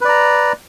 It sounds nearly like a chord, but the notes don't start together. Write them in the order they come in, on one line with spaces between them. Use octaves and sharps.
B4 D5 A#5